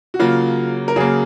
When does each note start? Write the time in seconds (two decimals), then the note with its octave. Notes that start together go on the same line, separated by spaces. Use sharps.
0.14 F#4
0.19 C#3 F#3 A#3 F4
0.88 A#4
0.96 C#3 F#3 A#3 G#4